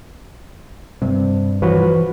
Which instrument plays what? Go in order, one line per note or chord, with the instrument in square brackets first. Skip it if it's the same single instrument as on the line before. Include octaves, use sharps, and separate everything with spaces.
[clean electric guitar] G2 [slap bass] C3
[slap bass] E3 F3 [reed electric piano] F#4 B4 C#5